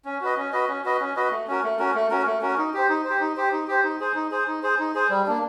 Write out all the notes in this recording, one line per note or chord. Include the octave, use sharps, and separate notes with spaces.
C#4
F#4 B4 D#5
C#4
F#4 B4 D#5
C#4
F#4 B4 D#5
C#4
F#4 B4 D#5
A3
C#4 F#4 A#4
A3
C#4 F#4 A#4
A3
C#4 F#4 A#4
A3
C#4 F#4 A#4
D#4
G4 C5
D#4
C5
G4
D#4
G4 C5
D#4
G4 C5
D#4
G#4 C5
D#4
G#4 C5
D#4
G#4 C5
D#4
G#4 C5
G3
A#3 D4